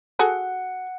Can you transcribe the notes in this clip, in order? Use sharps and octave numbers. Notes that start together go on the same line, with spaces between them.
F#4 G#4 A4 F#5